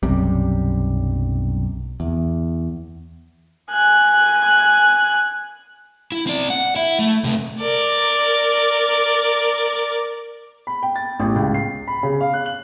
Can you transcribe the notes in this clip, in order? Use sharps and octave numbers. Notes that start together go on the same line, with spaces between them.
B1 F#2 C3 G3
E2
G#5 F#6
E4
C4 D5
F#5
E4
A3
C3 A3
A#4 D5
B5
G5
A6
A1
C#2
C7
B5
C#3
F5
F#6
F#7